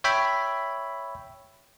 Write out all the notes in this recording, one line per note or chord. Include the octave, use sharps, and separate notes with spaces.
C#5 E5 G5 B5